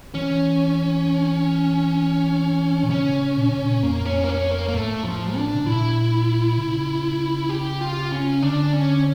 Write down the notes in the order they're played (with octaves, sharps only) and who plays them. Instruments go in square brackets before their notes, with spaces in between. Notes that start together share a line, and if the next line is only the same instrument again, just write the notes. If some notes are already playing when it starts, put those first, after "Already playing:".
[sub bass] E3 [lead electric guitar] C#4
[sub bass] A#2
[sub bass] C#3 [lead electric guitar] C#4
[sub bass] A#2
C#3
A#2
[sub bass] F2 [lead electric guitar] A#3
[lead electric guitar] C#4
A#3
C#4
A#3
A#3
[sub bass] A2 [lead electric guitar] A3
[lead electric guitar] F3
D4
[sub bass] C#3
[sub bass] A#2 [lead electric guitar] E4
[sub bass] C#3
[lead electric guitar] G4
F4
C#4
[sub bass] D3 [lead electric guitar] D4
[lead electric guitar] C#4